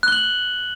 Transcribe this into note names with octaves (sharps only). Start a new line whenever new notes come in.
F#6 F#7 G7